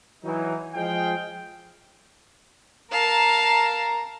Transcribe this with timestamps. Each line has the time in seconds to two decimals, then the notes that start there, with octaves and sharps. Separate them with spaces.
0.23 E3 F#3 D#4
0.74 F3 G#3 G#4 D#5 F5 G5
2.92 A#4 F5 A5 A#5